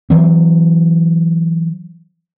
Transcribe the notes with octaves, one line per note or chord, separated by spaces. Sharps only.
E3 F#3 C4